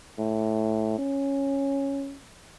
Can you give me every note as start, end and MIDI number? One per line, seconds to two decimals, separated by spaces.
0.18 0.97 45
0.99 2.17 61